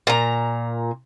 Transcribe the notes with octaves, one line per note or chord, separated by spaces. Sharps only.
A#2 A#5